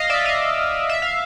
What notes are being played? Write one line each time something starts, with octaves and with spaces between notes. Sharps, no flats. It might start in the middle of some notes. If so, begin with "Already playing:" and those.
Already playing: D#5 F5
D5 E5
D#5 F5
E5
F5